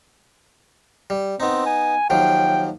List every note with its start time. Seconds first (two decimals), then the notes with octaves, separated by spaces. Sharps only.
1.10 G3
1.40 B3 C4 D#4
1.66 G#5
2.10 D#2 F3 F#3 G5